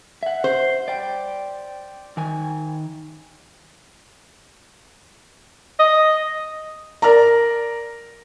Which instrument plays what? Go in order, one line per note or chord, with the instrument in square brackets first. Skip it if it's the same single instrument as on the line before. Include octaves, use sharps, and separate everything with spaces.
[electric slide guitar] E5 F#5
[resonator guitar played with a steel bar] C5
[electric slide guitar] D5 G5
D#3 G#5
[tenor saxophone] D#5
[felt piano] A#4 D5 A#5